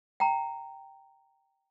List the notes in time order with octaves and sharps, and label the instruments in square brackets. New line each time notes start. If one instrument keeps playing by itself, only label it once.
[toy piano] G5 A#5